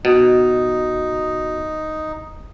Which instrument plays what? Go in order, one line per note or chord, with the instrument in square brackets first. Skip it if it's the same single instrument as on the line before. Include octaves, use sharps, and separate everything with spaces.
[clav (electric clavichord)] B2 [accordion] D#4